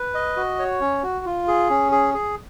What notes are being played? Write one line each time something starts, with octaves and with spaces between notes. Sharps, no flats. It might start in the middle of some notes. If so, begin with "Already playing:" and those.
Already playing: B4
D#5
F#4
C#5
C#4
F#4
F4
G#4
C#4
G#4
G#4